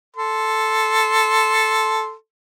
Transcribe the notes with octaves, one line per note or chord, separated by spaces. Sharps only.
A4 C6